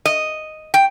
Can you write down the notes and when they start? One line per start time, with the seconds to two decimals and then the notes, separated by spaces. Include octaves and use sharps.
0.05 D#5
0.74 G5